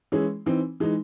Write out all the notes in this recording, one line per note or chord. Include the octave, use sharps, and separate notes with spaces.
E3 G#3 C#4 E4 G#4
E3 C4 D#4
E3 G#3 D#4